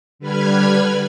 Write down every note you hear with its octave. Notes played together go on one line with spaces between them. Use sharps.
D3 G3 B4 B5 F6 G#6